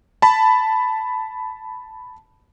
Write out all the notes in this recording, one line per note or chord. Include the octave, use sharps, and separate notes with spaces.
A5 B5